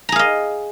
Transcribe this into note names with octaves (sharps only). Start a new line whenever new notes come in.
G#4 D#5 F5 A#5